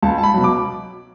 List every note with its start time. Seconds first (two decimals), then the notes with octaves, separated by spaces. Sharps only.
0.02 C#2 A5
0.18 A5
0.23 B5
0.34 B2 F#3
0.44 D6